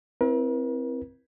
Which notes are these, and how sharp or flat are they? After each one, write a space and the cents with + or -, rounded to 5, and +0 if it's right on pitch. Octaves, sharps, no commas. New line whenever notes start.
C4 +0 E4 +0 A#4 +45